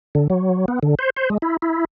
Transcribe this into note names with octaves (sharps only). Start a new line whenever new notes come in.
D3
F#3
B3
D3
C5
C5
G#3
E4
E4